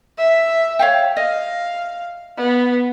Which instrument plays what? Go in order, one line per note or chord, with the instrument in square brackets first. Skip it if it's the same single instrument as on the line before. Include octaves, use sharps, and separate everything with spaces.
[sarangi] E5
[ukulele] C#5 F5 G5
[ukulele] D#5 [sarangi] F5
[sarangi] B3